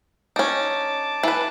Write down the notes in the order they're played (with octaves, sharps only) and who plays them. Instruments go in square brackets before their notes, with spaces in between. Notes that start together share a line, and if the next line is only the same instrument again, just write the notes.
[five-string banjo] C#4 D#4 [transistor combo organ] A5 D6
[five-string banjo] E3 B4